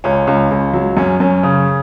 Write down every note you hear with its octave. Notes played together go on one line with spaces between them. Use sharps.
C#2 C#4
C#2
C#2
F#3
F#2 C#4
F#2 C#4
C#3